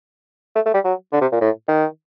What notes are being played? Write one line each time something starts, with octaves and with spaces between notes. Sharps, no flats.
A3
A3
G3
F#3
D3
C3
A#2
A2
D#3